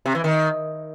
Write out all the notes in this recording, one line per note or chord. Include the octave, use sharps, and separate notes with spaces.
C3
E3
D#3